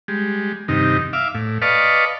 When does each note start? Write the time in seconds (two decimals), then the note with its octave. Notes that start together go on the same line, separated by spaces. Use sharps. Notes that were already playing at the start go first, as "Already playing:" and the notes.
0.08 G3 G#3
0.68 G2 C3 D#3 D#4
1.13 E5 F5 D6
1.34 A2
1.62 B4 D5 D#5 F5 A5 C#6